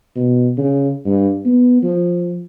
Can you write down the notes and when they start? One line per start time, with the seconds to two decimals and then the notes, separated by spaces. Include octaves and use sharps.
0.16 B2
0.58 C#3
1.06 G2
1.45 B3
1.83 F3